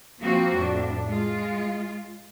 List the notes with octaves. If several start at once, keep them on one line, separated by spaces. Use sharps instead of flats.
F3 A#3 C4 F#4
F2 A2 D4
G#3 F4